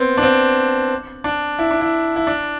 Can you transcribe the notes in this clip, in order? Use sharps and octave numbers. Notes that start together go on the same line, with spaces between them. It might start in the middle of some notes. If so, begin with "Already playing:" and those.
Already playing: B3 C4
D4
C4
D4
E4
D4
E4
E4
D4